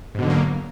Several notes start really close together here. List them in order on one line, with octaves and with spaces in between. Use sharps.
G#2 B2 D3 F#3 A#3